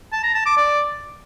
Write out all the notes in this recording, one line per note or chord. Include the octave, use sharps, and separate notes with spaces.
A5
A#5
A5
D6
D5